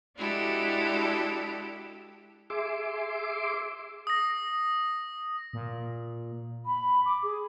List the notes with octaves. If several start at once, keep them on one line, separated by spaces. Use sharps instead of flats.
G#3 D4 E4 F#4 G4 A4
G#4 E5 C6 D6
D#6 A#6
A#2
B5
D6
G#4